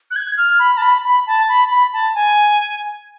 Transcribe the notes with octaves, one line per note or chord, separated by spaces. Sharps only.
F#6
G#6
F6
B5
A5
B5
B5
A5
B5
B5
A5
G#5